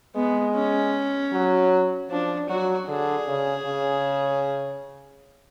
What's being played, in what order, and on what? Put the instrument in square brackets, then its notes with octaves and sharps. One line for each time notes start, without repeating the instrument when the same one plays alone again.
[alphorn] G#3 [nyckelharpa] B3
[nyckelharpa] C#4
[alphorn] F#3
[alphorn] F3 [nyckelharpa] D4
[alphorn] F#3 [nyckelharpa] F#4
[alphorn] D3 [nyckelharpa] G#4
[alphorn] C#3
C#3